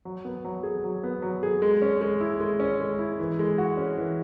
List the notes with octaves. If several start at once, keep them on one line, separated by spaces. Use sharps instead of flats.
F#3
B3
F#3
G#4
F#3
B3
F#3
G#4
G#3
C#4
G#3
E4
G#3
C#4
G#3
E4
E3
G#3
F#4
C#4
E3